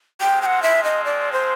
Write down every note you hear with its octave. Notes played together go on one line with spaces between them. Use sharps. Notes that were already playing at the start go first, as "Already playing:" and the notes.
F3 G#3 C4 G5
G5
F#5
E5
D#5
D5
C5